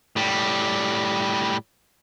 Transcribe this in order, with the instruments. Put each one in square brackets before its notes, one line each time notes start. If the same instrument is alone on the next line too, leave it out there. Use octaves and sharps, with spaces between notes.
[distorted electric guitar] A2 G3